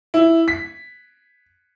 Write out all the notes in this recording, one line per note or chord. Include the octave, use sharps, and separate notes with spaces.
E4
B6